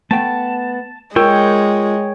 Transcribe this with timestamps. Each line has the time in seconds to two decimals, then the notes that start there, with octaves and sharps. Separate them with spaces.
0.11 A3 B3 G5 A5
1.16 G#3 F4 A#4 C#5 G5